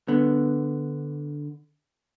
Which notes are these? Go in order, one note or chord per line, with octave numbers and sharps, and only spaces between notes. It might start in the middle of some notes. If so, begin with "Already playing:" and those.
D3 B3